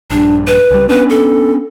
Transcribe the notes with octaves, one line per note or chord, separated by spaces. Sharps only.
A#1 G2 D4
B4
C#2 G3
B3 C#4 D4 B4
A4